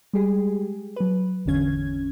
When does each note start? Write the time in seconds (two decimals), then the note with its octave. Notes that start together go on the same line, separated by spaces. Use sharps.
0.14 G3 G#3 G4 G#4
0.96 F#3 B4
1.45 G#1 E2 D3 C#4 G#6